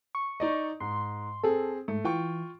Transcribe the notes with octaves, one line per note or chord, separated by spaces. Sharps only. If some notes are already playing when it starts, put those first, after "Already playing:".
C#6
D#4 D5 D#5
G#2 C6
C4 G#4 A4
G#2 A3
E3 F4 G5 C#6